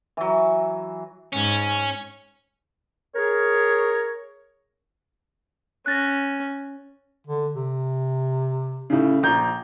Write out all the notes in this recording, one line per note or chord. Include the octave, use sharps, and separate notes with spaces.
E3 F#3
G#2 C#4
G#4 A#4 C#5
C#4 F#6 A6 A#6
D3
C3
A2 C#3
A#1 A#5 G6